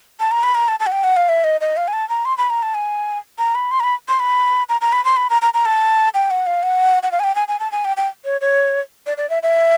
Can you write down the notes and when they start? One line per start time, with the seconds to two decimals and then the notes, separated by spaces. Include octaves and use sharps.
0.20 A5
0.31 A#5
0.43 B5
0.55 A#5
0.68 A5
0.80 A5
0.86 F#5
0.92 G5
1.04 F#5
1.16 F5
1.29 E5
1.44 D#5
1.61 D#5
1.77 F5
1.88 G#5
1.93 A5
2.09 A#5
2.25 C6
2.38 B5
2.50 A#5
2.63 A5
2.74 G#5
3.38 A#5
3.55 B5
3.71 C6
3.80 A#5
3.83 B5
4.08 C6
4.20 B5
4.69 A#5
4.81 A#5
4.93 B5
5.05 C6
5.17 B5
5.30 A#5
5.42 A#5
5.54 A#5
5.66 A5
6.14 G5
6.31 F#5
6.47 F5
6.63 F#5
7.03 F#5
7.12 F5
7.20 G#5
7.24 G5
7.35 G#5
7.48 G#5
7.60 A5
7.72 G#5
7.85 G5
7.97 G5
8.25 C#5
8.41 C#5
9.07 D5
9.18 D5
9.30 E5
9.43 E5